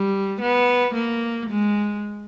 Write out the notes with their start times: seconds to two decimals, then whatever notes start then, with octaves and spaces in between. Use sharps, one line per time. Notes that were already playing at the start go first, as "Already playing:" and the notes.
Already playing: G3
0.41 B3
0.94 A#3
1.49 G#3